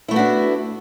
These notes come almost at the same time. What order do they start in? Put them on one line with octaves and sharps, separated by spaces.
E4 A3 B3 F#4 D4